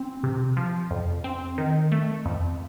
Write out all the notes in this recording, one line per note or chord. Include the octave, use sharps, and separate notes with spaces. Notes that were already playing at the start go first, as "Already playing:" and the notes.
Already playing: C4
C3
F3
F2
C4
D#3
A3
F2